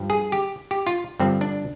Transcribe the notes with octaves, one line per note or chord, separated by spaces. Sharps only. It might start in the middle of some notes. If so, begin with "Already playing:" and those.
Already playing: G2 F3
G#4
G4
G4
F4
G2 D3 F3 C4
D4